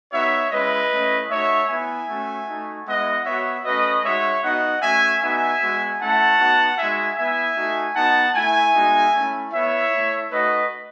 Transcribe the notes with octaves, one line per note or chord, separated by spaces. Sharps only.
B3 D#4 F#4 C#5 E5
G#3 C#4 E4 B4 D#5
A3 C#4 E4
A3 D#4 F#4 C#5 E5
B3 E4 E5 G#5
A3 C#4 F#4
A3 D#4 F#4
G#3 B3 E4 D#5 F#5
B3 F#4 C#5 E5
A3 C#4 F#4 B4 D#5
G#3 D#4 F#4 C#5 E5
B3 D#4 F#4 D#5 F#5
A3 C#4 F#4 E5 G#5
B3 D#4 F#4 E5 G#5
G#3 B3 F#4
A3 C#4 E4 F#5 A5
B3 D#4 F#4
G#3 D#4 F#4 E5 G#5
B3 E4 E5 G#5
A3 D#4 F#4
B3 D#4 F#4 F#5 A5
A3 E4 E5 G#5
G#3 B3 D#4 F#4
A3 C#4 E4
B3 E4 C#5 E5
A3 E4
A3 D#4 F#4 B4 D#5